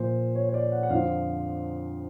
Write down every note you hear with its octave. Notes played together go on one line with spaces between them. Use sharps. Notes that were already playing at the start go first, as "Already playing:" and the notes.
Already playing: A#2 F3 C5
C#5
C#5
D5
F#5
F#5
F2 D3 F3 F5